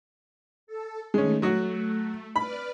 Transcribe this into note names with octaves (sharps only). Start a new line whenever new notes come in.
A4
D#3 G#3 A3 C#4
F#3 A3 F#4
B4 D5 B5 F6